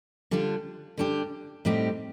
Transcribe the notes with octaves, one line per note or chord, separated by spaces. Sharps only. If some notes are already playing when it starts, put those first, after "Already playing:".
D3 G3 D4 F4
D3 G3 D4 G4
A2 G3 C4 D#4 G4